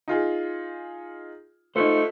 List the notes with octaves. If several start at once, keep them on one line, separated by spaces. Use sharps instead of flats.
D#4 F4 G#4
A3 D#4 F4 C5